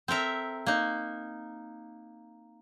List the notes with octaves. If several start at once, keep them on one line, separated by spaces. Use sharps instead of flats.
C4 A4 A#4 E5
A#3 D#4